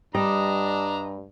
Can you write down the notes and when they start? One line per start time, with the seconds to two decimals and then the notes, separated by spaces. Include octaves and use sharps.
0.15 G2 G3 D4 D#5 A#5